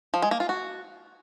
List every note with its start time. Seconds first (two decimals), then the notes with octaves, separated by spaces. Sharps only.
0.14 F3
0.22 G#3
0.31 A#3
0.40 F4
0.49 F#4